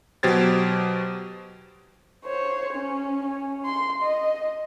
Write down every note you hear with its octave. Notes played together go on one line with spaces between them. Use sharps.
B2 F#3 G4 C5 G#6 A6
C5 C#5
C#4
C#4
C6
D#5